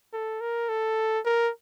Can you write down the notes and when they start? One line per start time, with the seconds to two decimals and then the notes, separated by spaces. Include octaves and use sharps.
0.13 A4
0.41 A#4
0.69 A4
1.25 A#4